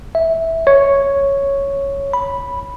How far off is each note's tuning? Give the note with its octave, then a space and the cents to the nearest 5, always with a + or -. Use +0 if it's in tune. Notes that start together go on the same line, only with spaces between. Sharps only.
E5 -10
C#5 +0
B5 -5